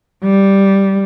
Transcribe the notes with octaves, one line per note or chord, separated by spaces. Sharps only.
G3